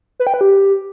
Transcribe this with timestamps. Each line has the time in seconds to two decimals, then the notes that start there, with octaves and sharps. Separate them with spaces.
0.20 B4
0.27 G5
0.34 B4
0.41 G4